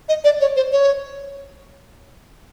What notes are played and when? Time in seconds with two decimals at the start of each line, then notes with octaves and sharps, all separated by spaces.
0.09 D#5
0.24 D5
0.41 C#5
0.56 C5
0.72 C#5